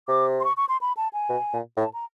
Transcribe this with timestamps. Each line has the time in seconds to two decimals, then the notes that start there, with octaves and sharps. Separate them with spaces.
0.08 C3 D6
0.40 C6
0.45 C#6
0.57 C#6
0.69 C6
0.81 B5
0.97 A5
1.13 G#5
1.29 B2
1.53 A#2
1.77 A2 A5
1.94 A#5